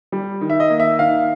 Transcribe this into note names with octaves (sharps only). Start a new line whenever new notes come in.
G3
D#3
E5
D#5
A#3
E5
D#3 F5